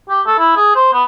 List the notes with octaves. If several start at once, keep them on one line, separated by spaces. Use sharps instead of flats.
G4
A4
E4
G#4
C5
B3